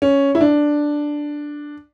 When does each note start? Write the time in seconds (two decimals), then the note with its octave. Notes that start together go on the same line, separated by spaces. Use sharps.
0.02 C#4
0.35 E4
0.41 D4